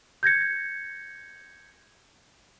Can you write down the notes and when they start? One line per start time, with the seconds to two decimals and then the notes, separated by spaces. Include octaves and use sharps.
0.23 G6 G#6 A#6 C#7